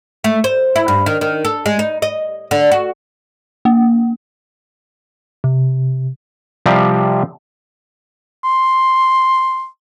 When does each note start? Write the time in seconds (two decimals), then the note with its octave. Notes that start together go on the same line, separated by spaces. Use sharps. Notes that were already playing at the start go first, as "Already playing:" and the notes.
0.24 A3
0.44 C5
0.76 E4
0.88 G2
1.06 D#3
1.21 D#3
1.45 A4
1.66 G#3
1.79 D#4
2.02 D#5
2.51 D3
2.72 F#4
3.65 A#3
5.44 C3
6.66 C3 F3 G3 C4 G4 D5
8.44 C6